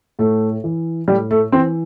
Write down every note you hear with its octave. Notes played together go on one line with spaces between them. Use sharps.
A2 A3
E3
A2 G3
A3
E3 C4